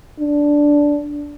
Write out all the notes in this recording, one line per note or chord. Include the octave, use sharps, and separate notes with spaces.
D4